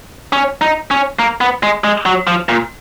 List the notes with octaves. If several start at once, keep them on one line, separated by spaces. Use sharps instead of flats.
C#4
D#4
C#4
A#3
B3
G#3
G#3
F#3
F3
A#2